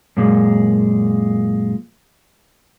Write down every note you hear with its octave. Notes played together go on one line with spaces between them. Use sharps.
F#2 A#2 G#3